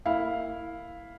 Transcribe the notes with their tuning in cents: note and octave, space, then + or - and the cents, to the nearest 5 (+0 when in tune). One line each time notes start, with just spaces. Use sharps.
A#3 -25 E4 +0 F5 +0